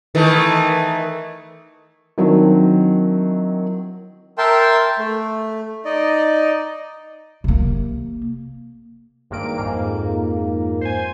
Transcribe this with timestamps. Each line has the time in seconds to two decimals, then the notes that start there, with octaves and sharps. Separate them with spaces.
0.15 D#3 E3 A3
2.18 D#3 F#3 C4 D4 E4
4.38 A#4 E5 G5 A5 C6
4.99 A3
5.85 D#4 D5 D#5
7.44 C3 A#3
9.30 G#1 G2 A#3 D7
9.58 F2 G#2 A#3
10.81 C5 G#5